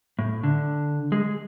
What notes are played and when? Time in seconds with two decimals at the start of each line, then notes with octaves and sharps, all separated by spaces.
0.19 A2
0.43 D3
1.12 G#3